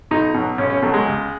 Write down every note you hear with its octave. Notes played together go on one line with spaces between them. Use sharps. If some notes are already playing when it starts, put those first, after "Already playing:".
B1 D#4
B2 F#3
B1 C#4
C#4
B2 F#3 A3
G#3
C#2